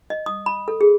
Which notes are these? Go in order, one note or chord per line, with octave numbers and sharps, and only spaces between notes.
D#5
D#6
B5
A4
G#4